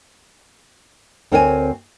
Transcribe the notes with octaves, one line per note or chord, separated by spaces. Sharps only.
D2 C4 A#4 C#5 F#5 G#5